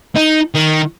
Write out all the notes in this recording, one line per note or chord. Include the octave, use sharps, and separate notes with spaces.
D#4
D#3